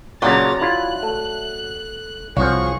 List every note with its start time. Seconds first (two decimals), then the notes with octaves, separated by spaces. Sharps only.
0.22 A#2 C#3 F#3 D4 F#4 A#5 A6
0.61 E4 F4 F#6
1.02 A3
2.37 C2 F3 F#4 G#4 C#5 C#6